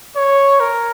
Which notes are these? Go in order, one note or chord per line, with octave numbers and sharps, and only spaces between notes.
C#5
A#4